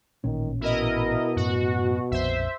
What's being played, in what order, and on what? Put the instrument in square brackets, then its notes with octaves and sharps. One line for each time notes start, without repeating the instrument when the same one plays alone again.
[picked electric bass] A1 A#2 C#4 [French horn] D#3
[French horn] B2 [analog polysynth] E4 A#4 D#5
[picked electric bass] F#2 A2 [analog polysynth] F#4
[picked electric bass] A#1 F2 [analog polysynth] C5 E5